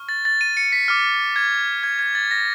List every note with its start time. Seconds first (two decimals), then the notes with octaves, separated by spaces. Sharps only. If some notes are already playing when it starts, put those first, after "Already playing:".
Already playing: C#6 F6
0.09 A6
0.25 A6
0.41 D#7
0.57 C#7
0.72 B6
0.88 D6 F6
1.36 G#6
1.83 G#6
1.99 G#6
2.15 A6
2.31 A#6